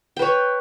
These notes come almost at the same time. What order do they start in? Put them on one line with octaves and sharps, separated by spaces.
G5 B4 C#5